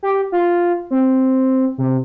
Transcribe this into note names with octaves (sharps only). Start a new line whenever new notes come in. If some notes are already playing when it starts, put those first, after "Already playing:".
G4
F4
C4
C3